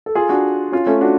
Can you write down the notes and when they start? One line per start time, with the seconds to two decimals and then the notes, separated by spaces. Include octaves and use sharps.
0.06 A4
0.15 F4 G#4
0.29 D4 F#4
0.72 C#4 F4
0.87 A3 C#4
1.01 D4 F#4